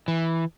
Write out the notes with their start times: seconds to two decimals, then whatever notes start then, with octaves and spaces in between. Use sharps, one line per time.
0.08 E3